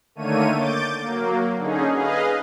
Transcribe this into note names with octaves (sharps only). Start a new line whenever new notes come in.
D3 D#3 A3 A#3 C#5 D#7
D6 G6 A6
F#3 A#3
D3 C#4 D#4 G#4
G#4 B4 D#5 F5